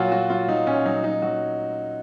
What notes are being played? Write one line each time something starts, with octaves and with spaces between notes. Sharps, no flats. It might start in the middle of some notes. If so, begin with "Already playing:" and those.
Already playing: A#2 F#3 F4 F#4
F#3 F#4
F#3 F4
F#3 D#4
A#2 C#4
F#3 D#4
F#3 D#4
F#3 F#4